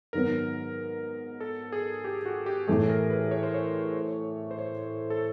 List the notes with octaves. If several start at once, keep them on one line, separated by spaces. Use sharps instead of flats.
G#2 D#3 F#3 B3 A#4
A4
G#4
G4
F#4
G4
A2 E3 A3 G#4
A#4
B4
C#5
C5
C#5
C5
C#5
A4